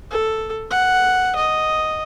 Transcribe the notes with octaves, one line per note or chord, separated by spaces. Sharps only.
A4
F#5
D#5